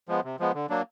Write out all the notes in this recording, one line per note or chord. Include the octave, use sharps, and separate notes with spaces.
F3 G#3 B3
C3
F3 G#3 B3
D3
F#3 A#3 D4